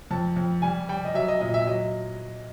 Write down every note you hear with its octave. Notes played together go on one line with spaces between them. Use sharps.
F2 A5
F2
G3 G#5
G3 G5
D#5
F#3 E5
D#5
A#2 D#5
E5
F#3 D#5